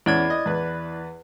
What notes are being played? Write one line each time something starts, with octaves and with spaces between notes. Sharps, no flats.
E2 C#4 E4 D5 G#6
D#5
E2 B4